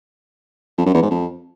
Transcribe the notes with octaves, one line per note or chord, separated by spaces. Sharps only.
F2
F#2
E2
G#2
F2